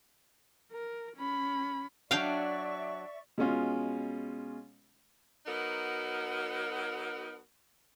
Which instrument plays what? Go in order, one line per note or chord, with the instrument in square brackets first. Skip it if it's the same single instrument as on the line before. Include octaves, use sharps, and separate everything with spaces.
[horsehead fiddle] A#4
C#4 B5
[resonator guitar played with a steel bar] F#3 D4 [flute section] D5 E5 C#6 [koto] F5 G5
[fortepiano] B2 G#3 C#4 F4
[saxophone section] F#3 B3 D#4 F#4 A#4